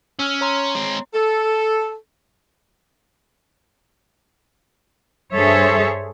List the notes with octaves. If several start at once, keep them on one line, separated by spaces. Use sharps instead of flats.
C#4 E6 F6
C#5 A#5 C6
G#3 C4
A4
G2 G#4 A4 C5 C#5 E5